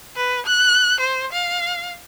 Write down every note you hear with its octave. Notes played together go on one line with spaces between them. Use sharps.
B4
F#6
C5
F5